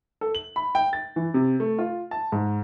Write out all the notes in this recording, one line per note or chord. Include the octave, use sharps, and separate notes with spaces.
A4
F#7
B5
G5
A6
E3
C3
A3
F4
A5
G#2